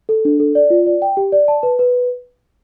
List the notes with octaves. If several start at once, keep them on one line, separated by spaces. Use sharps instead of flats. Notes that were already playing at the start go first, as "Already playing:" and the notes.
A4
D4
A4
D5
F4
D5
G5
G4
D5
A5
B4
B4